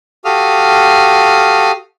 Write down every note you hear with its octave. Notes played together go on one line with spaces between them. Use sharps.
F#4 G4 A4 F5 D#6 F6